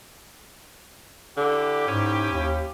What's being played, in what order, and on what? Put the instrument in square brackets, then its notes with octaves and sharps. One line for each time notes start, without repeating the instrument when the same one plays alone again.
[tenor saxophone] D3 [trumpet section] E4 G4
[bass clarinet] G#2 [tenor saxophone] C#4
[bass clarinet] D#2